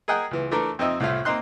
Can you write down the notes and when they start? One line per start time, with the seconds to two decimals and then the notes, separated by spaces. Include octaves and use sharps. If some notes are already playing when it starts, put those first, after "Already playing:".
0.08 G#4 A#4 D#5 F#5 G5
0.31 C#2 E3
0.51 E3 A3 D4 A4 A#4
0.79 F2 C4 D#4 D#5 E5
1.00 C2 A2 A3 F4
1.25 A#3 C4 D#4 C6 F#6